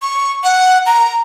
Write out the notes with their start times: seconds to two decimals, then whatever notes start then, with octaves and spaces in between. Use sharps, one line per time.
0.02 C#6
0.44 F#5
0.86 A#5